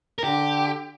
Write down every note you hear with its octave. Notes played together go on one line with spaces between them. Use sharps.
A#4
D3 G4